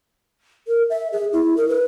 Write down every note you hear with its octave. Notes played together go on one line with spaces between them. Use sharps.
A#4
E5
G#4
E4
A#4
B4